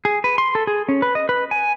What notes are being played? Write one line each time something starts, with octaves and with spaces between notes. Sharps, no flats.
G#4
B4
C6
A4
G#4
C#4
B4
D#5
B4
G#5